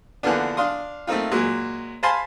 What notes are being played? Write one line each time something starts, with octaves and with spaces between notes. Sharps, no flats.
D3 E3 F3 A#3 B3 D4
D4 F5 C6 D#6
A3 A#3 C4 D#4 F4
A#2 F#3 G#3
C5 F5 G#5 A5 B5 C6